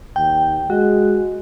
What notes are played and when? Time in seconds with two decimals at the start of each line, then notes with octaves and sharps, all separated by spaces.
0.16 D#2 G5
0.70 G#3 F#4